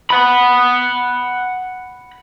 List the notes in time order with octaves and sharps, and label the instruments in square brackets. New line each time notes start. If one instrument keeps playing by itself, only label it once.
[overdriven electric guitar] F#5 B5